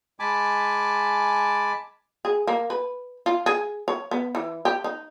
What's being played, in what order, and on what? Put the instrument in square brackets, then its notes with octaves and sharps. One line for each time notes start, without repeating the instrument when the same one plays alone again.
[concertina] G#3 G#5 A5 B5 D6
[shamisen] G#4
A#3
B4
F4
G#4
C#5
B3
E3
G4
D#4